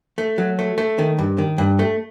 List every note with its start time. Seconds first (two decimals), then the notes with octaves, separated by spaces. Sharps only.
0.18 A3
0.38 F#3
0.59 A3
0.78 A3
0.98 D#3
1.19 G2
1.38 D#3
1.58 G2
1.79 A3